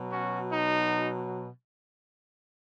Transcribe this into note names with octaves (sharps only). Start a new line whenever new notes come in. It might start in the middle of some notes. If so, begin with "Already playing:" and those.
Already playing: B2 F#3
C#4 F#4
D#4